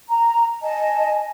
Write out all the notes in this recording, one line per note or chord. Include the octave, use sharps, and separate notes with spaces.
A#5
D#5 G#5 A5